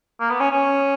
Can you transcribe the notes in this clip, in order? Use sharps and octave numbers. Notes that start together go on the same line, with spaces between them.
A#3
B3
C#4
C#4